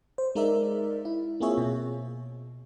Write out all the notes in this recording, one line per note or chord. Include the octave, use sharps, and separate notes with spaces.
C5
G#3 D#4 A#4 D5 E5
E4
A#3 C4 F4 G#4 C#5 E5
B2